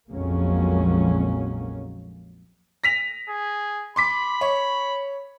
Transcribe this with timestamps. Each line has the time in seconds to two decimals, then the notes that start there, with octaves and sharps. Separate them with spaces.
0.10 A#1 F2 F#3 G#3 A#3 C#4
2.84 A#6 B6 F7
3.30 G#4
3.96 B5 C6 D6 B6
4.41 C#5